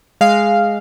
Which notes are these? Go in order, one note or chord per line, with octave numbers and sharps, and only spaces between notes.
G#3 F5